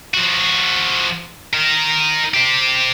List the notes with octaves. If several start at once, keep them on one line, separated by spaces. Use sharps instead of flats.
F3 F#4
D#4 A#4
C4 G4